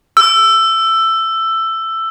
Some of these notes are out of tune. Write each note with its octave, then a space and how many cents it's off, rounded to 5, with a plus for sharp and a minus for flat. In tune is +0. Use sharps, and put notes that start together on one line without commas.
E6 +10